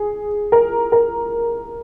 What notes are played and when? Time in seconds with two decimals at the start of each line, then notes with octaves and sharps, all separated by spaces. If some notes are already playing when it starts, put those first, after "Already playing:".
Already playing: G#4
0.52 A#4
0.92 A#4